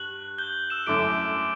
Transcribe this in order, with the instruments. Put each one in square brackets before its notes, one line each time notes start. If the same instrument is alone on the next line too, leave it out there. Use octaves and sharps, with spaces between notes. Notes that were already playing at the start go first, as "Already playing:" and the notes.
Already playing: [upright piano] G2 [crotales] F#6 F#7
[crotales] G6 G7
E6 E7
[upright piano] F#2 D3 A3 E4 [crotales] D6 D7